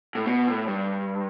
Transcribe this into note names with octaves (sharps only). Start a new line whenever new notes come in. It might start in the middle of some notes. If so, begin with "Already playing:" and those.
A2
B2
A2
G2